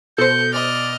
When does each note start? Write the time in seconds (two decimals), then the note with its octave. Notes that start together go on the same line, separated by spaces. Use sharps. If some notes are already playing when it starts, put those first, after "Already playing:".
0.18 B2 A4 C5 G6 C#7
0.53 D5 D#5 F6